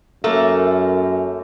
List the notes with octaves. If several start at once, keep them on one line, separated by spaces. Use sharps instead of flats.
F#2 A3 A#3